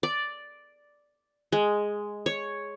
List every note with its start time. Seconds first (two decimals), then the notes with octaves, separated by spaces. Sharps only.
0.03 D5
1.52 G#3
2.26 C#5